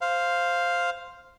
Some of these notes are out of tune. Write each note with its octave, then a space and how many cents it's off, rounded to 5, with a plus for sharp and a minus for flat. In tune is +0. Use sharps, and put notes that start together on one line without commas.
C5 +0 F5 +0